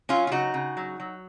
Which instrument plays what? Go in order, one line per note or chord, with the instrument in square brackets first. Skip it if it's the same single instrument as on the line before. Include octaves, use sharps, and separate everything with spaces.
[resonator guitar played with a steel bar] F#3 C#4 F4
F4
C#3 D#4 F#4
C#3
F#3
F#3